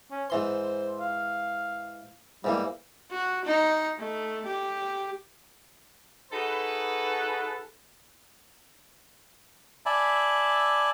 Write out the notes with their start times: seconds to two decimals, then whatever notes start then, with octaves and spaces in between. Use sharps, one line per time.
0.11 C#4
0.30 G#2 E3 C5 C6
1.00 F5
2.44 G#2 E3 G3 A#3
3.11 F#4
3.45 D#4
3.99 A3
4.46 G4
6.32 D#4 F#4 G#4 A4 B4
9.86 D5 E5 G#5 A5 B5